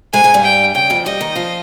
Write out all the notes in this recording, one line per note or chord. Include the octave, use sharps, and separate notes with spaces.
G#2 G#3 G#5
G#2 G#3
G2 G3
G5
C#3 G5
F2 F3
G2 G3 D#5
D#3 D#4
F3 F4